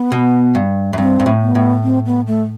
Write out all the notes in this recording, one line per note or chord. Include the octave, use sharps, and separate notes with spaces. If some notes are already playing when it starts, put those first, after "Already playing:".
Already playing: B3
B2
G2
F#2
G2 C4
G2
A2
B3
A2
C4
B3
A3